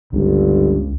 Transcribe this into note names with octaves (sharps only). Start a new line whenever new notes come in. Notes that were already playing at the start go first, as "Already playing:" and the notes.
G1 C#2